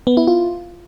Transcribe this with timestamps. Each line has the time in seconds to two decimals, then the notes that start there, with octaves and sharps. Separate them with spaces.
0.07 B3
0.17 E4
0.27 F4